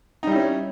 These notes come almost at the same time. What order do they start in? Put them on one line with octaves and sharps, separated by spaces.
D#4 G3 E4 C#4